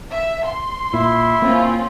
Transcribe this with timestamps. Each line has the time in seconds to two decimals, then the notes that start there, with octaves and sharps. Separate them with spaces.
0.11 E5
0.45 C6
0.94 A#2 E4
1.42 A#3 C4 C#4 F4